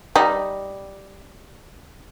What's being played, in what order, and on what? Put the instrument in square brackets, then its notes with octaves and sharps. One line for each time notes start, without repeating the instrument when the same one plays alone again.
[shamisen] G3 D#4